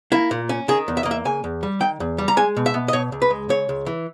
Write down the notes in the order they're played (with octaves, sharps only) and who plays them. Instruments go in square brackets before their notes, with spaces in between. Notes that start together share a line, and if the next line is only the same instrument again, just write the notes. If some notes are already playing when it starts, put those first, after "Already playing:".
[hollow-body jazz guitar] A#3 E4
A#2
C#4
D#3 G#4
E2
E5
A#3 D#5
E5
C#3 G#5
E2
G3
D#3 G5
E2
G3
A#5
G#3 G#5
B2
E5
B3
D#5
B2 C#5
C#2
B4
G#3
C#3 C#5
C#2
E3